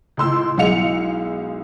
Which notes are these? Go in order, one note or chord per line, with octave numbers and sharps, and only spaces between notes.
C#2 A2 C6 E6
B1 G#3 E4 F5 C#7 F7